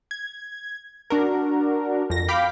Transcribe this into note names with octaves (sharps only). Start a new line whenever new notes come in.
G#6
D4 F#4 A#4
F2 A#6
F5 G5 B5 D6 G6 B6